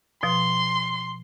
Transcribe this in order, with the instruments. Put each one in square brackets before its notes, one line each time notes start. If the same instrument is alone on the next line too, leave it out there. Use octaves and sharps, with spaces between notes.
[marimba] B2 F3 [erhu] C6